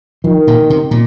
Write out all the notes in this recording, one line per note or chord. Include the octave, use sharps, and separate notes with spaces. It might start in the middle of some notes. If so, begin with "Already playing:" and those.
D#3 F3
A#2
C3
A#2